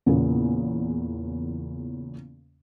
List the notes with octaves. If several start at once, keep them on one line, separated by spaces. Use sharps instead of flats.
E2 A#2 C#3